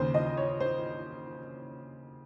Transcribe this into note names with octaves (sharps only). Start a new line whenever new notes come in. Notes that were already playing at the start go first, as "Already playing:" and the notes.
Already playing: D#2 C#3 C5
D#5
C#5
C5